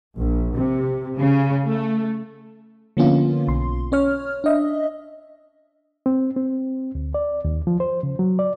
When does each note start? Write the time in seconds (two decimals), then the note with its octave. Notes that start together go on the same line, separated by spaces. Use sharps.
0.17 A#1
0.56 C3
1.18 C#3
1.67 A3
2.97 D3 F3 A#3 B3 C#4 F4
3.48 B1 C6
3.92 C#4 C#5 F6
4.44 D4 D#5 E5
6.06 C4
6.37 C4
6.95 D2
7.14 D5
7.45 D#2
7.67 F3
7.80 C5
8.03 C#3
8.19 F#3
8.39 D5